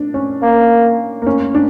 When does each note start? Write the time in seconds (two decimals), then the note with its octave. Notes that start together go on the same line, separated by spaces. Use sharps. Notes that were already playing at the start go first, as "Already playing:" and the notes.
Already playing: D4
0.14 C#4
0.43 A#3
1.22 A#3
1.27 C#4
1.55 D4